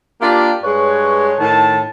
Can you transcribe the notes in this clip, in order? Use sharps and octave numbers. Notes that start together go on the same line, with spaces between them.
A#3 D4 F4 G4
G2 G#3 B4 C#5
A2 D#3 A5